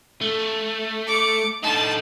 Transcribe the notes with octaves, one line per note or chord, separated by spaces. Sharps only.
A3
D6 C#7
D3 D#4 A5